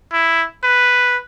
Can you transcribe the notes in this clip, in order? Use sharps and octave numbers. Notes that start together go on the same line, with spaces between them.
E4
B4